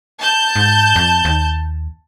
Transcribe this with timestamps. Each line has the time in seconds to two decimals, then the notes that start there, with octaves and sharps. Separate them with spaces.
0.20 A5 G6
0.56 G#2
0.96 F2
1.25 D#2